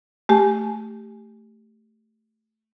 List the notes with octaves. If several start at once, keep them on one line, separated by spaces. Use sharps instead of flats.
A3 G4 G#5